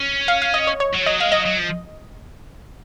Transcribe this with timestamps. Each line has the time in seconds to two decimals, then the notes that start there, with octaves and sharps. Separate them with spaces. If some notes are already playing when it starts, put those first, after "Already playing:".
Already playing: C#4
0.28 F5
0.42 F5
0.54 D#5
0.67 C#5
0.80 C#5
0.93 F#3
1.02 F3
1.06 F#3 D#5
1.19 G#3 F5
1.32 F#3 D#5
1.45 F#3
1.58 F3